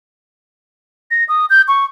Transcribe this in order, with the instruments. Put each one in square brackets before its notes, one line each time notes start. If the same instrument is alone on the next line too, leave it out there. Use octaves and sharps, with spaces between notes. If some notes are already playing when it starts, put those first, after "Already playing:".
[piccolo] A#6
D#6
G6
C#6